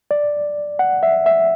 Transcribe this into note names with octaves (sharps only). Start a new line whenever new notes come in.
D5
F#5
E5
E5